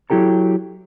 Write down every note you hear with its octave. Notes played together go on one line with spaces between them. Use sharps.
F#3 E4 G4 A4 A#5